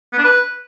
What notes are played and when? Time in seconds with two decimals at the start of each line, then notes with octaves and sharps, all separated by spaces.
0.13 B3
0.18 D4
0.24 B4